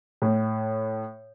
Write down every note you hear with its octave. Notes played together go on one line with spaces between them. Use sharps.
A2